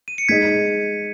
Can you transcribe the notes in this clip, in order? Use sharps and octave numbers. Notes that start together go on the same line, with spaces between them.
D#7
C#7
G#3 D#4 G#4 D#5 G#6 B6